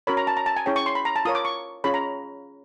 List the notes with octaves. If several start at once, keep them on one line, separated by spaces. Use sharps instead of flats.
C#4 F#4 A#4 C#5 B5
A#5
A5
A#5
A5
G#5
C#4 E4 G#4 C#5 G5
C#6
C6
B5
A#5
A5
F4 A#4 C#5 D#6
D6
C#6
C#4 F4 G#4 C#5 B5
A#5